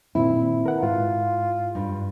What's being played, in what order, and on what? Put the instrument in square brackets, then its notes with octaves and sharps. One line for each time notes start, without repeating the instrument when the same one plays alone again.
[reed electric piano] A#2 D#3 C4 [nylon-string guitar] E4
[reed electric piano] A#4 B4 F#5
[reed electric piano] G#2 [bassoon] F4
[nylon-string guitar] G2